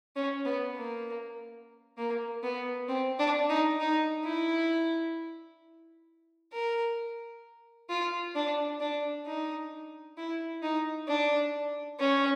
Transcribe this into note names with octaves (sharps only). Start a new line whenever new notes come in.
C#4
B3
A#3
A#3
B3
C4
D4
D#4
D#4
E4
A#4
F4
D4
D4
D#4
E4
D#4
D4
C#4